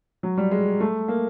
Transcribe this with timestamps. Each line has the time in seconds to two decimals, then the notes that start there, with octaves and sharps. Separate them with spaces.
0.23 F#3
0.38 G3
0.51 G#3
0.80 A3
1.08 A#3